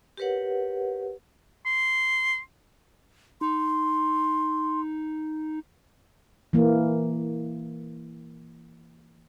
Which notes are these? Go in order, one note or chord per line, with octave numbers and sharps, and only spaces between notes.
G4 A#4 B4 C#5 F#5
C6
D#4 C6
E3 A#3